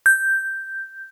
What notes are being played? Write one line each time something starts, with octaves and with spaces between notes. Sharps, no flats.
G6